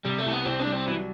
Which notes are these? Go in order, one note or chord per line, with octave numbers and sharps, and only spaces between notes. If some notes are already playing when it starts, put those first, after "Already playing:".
C3 G3
A3
C2
B3
C2 C4
D4
G3
C4
E3 F#3